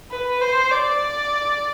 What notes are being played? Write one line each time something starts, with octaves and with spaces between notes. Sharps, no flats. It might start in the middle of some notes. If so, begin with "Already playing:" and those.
B4
C5
D5